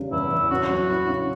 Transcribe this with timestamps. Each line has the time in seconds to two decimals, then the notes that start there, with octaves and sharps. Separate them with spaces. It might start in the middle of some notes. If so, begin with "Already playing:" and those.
Already playing: E2 C#3 G3
0.12 E2 E4
0.31 E2
0.51 C#4 F#4
0.70 F#3
0.89 E4
1.09 C#3